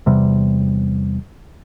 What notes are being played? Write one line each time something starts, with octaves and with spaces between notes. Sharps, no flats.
E2 C3 G3